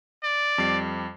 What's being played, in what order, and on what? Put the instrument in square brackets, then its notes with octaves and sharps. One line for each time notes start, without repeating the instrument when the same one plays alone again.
[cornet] D5
[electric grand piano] F2 G3 C7